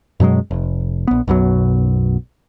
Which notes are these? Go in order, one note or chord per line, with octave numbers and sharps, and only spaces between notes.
F#2 B2 F#3 G#3
F1
A#1 B3
B1 F#2 B2 F#3